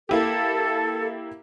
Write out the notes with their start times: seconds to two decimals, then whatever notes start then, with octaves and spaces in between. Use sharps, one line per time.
0.09 A#3 E4 G4 A4